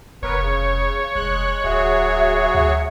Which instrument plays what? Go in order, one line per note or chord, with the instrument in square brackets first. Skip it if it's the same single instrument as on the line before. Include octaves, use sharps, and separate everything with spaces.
[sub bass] F1 [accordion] B3 A#4 B4 [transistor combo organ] C#5
[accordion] C#3
[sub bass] F1 [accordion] G#3 F#6
[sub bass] D1 [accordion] F#3 F#4 G#4 [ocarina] E5
[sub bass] D2 [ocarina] E5